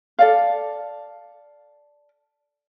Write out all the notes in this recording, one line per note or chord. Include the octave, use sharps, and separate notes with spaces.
A4 D5 F5